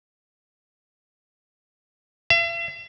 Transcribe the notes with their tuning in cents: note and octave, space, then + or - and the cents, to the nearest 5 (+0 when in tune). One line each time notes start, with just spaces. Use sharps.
E5 +45